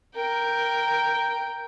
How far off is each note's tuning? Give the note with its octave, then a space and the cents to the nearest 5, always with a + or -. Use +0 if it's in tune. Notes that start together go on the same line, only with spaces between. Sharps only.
A#4 +0 G5 +0